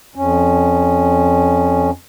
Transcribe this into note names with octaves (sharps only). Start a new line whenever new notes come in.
F2 C#4